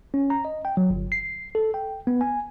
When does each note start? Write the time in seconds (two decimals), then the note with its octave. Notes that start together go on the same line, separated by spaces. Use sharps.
0.14 C#4
0.30 A#5
0.45 D#5
0.65 G5
0.77 F#3
0.90 G1
1.12 C7
1.55 A4
1.74 G5
2.07 B3
2.21 G#5